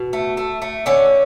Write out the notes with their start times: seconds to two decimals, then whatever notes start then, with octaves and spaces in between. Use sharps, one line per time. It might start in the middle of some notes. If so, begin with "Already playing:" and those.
Already playing: B2
0.13 A3
0.37 A3
0.62 A3
0.86 D3 C#4